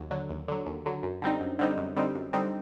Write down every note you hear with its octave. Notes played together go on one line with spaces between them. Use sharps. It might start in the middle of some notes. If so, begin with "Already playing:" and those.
Already playing: D#2 F#3
D3 F#3
D#2
D3 F#3
D#2
D3 F#3
F#2
D3 G3 C4 D#4
F#2
D3 G3 C4 D#4
F#2
D3 G3 C4 D#4
F#2
D3 G3 C4 D#4